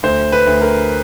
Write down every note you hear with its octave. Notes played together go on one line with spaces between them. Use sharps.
D2 C5
B4
D2
A#4